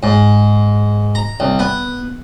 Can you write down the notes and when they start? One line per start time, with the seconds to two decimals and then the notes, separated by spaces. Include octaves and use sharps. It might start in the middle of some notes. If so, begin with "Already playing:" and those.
0.03 G#2
1.15 A#5
1.40 C2
1.59 B3